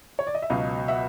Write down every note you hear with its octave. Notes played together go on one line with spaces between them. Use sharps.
C#5
D5
D#5
E5
C#2 B2 F#3 D#5 F5
E5 F#5